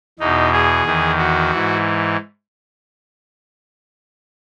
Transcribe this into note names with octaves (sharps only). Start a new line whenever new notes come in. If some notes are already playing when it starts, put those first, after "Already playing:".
E2 B2 D#4
G#4
E2 D#3
F#4
G#2 E3